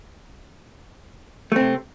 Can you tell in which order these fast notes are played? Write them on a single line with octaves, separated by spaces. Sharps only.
A3 C4 C3